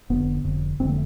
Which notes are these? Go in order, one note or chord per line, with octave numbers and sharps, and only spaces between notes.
F1 F2 D3 B3
F1 F2 D3
F1 F2 D3 C4
A3